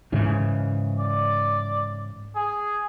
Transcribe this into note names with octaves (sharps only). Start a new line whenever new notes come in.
G#2 C#3 E3
D5
G#4